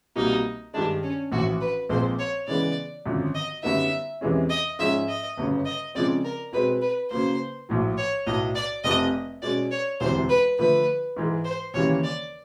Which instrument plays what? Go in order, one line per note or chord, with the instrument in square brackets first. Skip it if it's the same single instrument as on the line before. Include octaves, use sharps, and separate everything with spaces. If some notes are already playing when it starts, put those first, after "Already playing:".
[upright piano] C2 B2 G3 A#3 [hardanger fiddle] D#4
[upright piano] G2 D#3 G#3 [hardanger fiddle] D4
[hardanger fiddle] C#4
[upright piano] A#1 A2 E3 [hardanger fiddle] F#4
[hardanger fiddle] B4
[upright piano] A#1 A#2 F3 G#3 C4 [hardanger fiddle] C5
[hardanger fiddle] C#5
[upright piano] C#3 E3 G#3 B3 [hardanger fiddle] D5
[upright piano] G#1 F#2 D3 F3
[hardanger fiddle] D#5
[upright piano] F#2 D3 G3 B3 D#4 [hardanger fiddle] E5
[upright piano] E2 C3 E3 G#3 C#4
[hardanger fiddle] D#5
[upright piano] G#2 F3 G#3 C#4 [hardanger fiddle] E5
[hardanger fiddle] D#5
[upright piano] G1 F#2 C#3
[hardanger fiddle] D#5
[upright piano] C#3 F3 G#3 C4 [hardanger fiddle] D5
[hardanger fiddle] A#4
[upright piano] B2 G#3 C4 [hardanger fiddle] B4
[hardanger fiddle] B4
[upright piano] C#3 F#3 A#3 [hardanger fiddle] C5
[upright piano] A#1 A2 F#3
[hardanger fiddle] C#5
[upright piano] B1 A2 F#3 [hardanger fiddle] D#5
[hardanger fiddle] D5
[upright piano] F1 F2 C3 [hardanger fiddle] D#5
[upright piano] B2 G#3 C#4 [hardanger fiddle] D5
[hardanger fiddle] C#5
[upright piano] E1 D2 C3 E3 [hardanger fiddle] C5
[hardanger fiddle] B4
[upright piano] D3 F3 A3 [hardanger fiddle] B4
[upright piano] G#2 E3 G#3
[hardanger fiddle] C5
[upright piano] D#2 C#3 E3 G3 A#3 [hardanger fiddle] C#5
[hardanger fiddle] D5